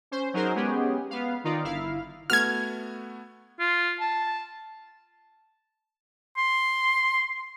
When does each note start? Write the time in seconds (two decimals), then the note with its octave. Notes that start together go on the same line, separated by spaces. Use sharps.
0.11 C#4 C5
0.34 F#3 D#4 G#4 A#4 C5
0.55 G#3 B3 C#4 G4 G#4
1.10 B3 F5
1.44 D#3 D#4 F4 D5
1.63 G1 E4 F5
2.30 A3 B3 F#4 F6 G#6
3.60 F4
4.00 A5
6.37 C6